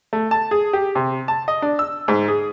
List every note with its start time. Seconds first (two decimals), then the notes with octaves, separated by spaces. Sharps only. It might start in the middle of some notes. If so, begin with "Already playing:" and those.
0.13 A3
0.31 A5
0.51 G#4
0.73 G4
0.95 C3
1.28 A5
1.48 D#5
1.62 D4
1.79 E6
2.08 G#2
2.28 G#4